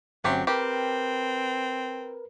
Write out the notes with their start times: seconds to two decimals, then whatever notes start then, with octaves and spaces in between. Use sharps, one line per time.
0.24 G1 F#3 A3 C4 C#4 G4 C5
0.47 C4 G4 A#4 B4